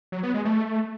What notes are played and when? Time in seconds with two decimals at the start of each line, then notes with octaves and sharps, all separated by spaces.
0.12 F#3
0.23 B3
0.34 G#3
0.45 A3